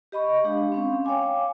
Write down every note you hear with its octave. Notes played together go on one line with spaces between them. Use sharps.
G4 D#5 B5 C#6
G#3 D4 G4 F5
C4 C#4 F5
C#5 F5 G5 G#5 D6